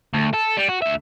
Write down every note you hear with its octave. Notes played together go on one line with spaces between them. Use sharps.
D2
A4
G3
F#4
D2 E5